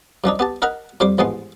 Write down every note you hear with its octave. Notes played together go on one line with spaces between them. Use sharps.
F#2 F3 D4 D#4
B3 G4 A5
D#4 A#4 F#5 A#5 B5
F2 G3 C5 C6 D6
A1 G#2 F3 G#3 B3 C6